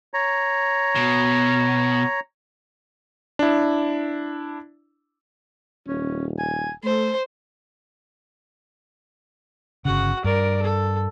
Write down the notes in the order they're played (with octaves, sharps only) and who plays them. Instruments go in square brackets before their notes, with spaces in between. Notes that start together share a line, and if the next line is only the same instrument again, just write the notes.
[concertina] C#5 A#5
[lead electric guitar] B2
[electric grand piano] D4 E4
[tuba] D#1 [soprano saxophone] C#4
[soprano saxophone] G#5
[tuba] A3 [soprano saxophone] A4 [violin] C5
[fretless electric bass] G1 C#3 [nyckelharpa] F#4 F#5
[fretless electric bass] G2 [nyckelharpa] A#4 D5
[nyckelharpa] A4